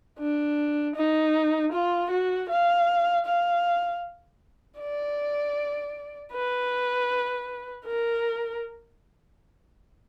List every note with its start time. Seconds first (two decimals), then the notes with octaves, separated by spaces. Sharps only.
0.19 D4
0.95 D#4
1.73 F4
2.11 F#4
2.49 F5
3.26 F5
4.79 D5
6.33 B4
7.86 A#4